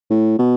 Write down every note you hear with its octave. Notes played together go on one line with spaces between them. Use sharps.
A2
B2